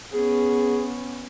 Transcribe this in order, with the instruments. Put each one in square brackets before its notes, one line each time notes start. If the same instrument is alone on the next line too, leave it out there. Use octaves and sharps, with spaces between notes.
[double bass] B3 C#4 [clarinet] G#4